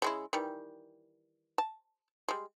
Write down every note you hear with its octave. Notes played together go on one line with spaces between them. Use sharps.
C#3 G#3 E4
D#3 E3 G3
A5
G3 G#3